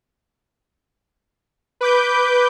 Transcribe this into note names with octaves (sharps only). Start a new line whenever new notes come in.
B4 D6 G6